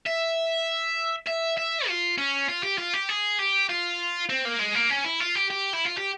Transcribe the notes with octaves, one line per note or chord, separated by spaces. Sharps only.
E5
E5
E5
F4
C#4
F4
G4
F4
G4
G#4
G4
F4
C4
A#3
G#3
A#3
C#4
E4
F4
G4
G4
E4
F4
G4